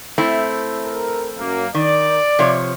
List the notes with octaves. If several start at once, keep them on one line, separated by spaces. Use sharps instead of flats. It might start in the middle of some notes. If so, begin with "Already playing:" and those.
A3 C4 E4
A#4
F#2 A#3
D#3 D5
C3 F3 C#5